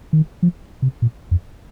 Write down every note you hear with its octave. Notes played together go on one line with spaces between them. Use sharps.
D#3
F3
C3
A#2
F2